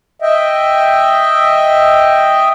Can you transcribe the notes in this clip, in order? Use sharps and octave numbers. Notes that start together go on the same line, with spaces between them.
D#5 E5 G5